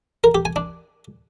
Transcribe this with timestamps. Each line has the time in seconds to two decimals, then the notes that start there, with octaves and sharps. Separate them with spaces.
0.24 A#4
0.35 G4
0.45 G#5
0.56 D4